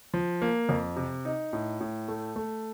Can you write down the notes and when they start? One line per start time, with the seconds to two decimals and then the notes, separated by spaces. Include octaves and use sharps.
0.14 F3
0.42 A#3
0.69 F2
0.96 C3
1.25 D#4
1.53 A2
1.81 A2
2.08 A3
2.36 A3